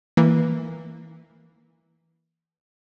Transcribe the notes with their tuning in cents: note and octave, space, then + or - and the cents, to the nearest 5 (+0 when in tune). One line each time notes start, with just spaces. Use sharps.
E3 -10 A#3 +0